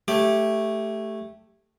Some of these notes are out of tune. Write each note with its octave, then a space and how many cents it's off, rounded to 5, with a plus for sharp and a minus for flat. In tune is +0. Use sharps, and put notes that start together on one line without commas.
A3 +0 G4 +0 C#5 -10